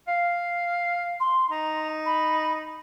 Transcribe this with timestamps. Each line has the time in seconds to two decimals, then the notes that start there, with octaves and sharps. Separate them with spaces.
0.08 F5
1.20 C6
1.50 D#4 A#5
2.06 B5